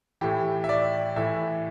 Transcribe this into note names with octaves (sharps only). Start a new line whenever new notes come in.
A2 E3 G4
E5
D5
A2 E3 E5